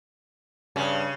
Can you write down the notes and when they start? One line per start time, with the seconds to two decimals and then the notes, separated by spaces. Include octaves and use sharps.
0.76 G2 C#3